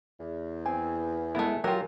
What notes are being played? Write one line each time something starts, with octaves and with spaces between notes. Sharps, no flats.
E2
C4 G#5
G#3 A3 B3 E4 A#4
F#3 F4 G4 A#4